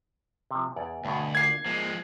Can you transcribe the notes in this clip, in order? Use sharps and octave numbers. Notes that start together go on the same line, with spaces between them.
C3 F3
E2 C#5 D5
D2 G2 B2
D4 F4 A#4 G#6 C7
F3 G#3 A#3